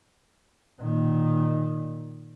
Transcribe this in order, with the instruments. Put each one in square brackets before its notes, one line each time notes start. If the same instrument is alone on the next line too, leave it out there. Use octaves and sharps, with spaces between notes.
[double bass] A#2 D#3